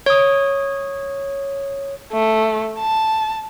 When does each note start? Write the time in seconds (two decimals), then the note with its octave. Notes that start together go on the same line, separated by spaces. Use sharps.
0.06 C#5 D#6
2.12 A3
2.79 A5